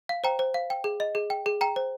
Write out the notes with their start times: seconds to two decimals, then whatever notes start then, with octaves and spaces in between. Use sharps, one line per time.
0.09 F5
0.24 C5 G5 A#5
0.39 C5
0.54 F5
0.70 G5
0.84 G#4
1.00 D#5
1.15 G#4
1.30 G5
1.46 G#4
1.61 G5 A#5
1.76 C5